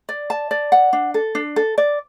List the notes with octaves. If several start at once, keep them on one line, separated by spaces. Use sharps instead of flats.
D5
A5
D5
F#5
D4
A4
D4
A4
D5